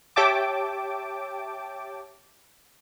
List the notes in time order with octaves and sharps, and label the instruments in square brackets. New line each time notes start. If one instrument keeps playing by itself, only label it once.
[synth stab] G4 C#5 E5 G5 A5 D6